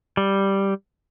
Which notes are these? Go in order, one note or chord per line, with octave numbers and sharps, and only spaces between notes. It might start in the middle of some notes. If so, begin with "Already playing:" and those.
G3